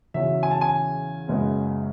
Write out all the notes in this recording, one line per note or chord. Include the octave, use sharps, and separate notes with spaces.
E2 C#3 F#3 C#4 E5
G#5
A5
G#5
F#1 F#2 C#3 G#3 B3